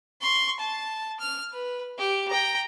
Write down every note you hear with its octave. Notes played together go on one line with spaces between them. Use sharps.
C6 C#6
A5
F6
B4
G4
G5 A#5